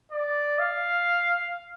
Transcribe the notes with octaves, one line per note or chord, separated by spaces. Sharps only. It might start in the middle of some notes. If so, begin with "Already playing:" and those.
D5
F5